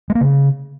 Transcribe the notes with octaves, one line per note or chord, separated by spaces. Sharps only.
G#3
A#3
C#3